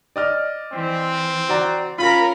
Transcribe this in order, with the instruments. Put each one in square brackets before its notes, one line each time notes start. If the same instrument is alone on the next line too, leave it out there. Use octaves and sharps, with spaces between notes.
[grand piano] D5 D#5 F6
[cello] E3 [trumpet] C4
[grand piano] F#4 D5 A#5
[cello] C#4 A#4 [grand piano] F4 [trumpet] B5